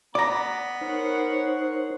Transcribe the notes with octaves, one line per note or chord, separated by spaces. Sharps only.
B3 D5 A#5 B5
D#4 A#4 C5 C#5 F#5